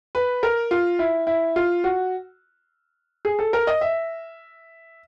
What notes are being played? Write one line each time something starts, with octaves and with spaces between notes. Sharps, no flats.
B4
A#4
F4
E4
E4
F4
F#4
G#4
A4
A#4
D#5
E5